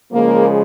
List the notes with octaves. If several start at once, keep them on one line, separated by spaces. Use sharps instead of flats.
C#3 F3 G#3 A#3